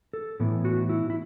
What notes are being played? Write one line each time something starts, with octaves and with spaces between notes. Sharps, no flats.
A4
A2 E3 B3 E4
F#4
E4
E4